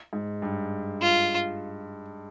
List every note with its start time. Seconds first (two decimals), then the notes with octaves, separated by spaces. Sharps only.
0.13 G#2
0.42 G2
1.01 F4